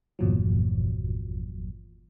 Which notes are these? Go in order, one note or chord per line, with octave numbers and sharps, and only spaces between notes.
G1 E2 A#2 F3 F#3